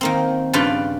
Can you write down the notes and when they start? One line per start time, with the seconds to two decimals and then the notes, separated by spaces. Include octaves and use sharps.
0.01 D#3 A#3 C4
0.53 G2 C#3 F4 B4 D5 G5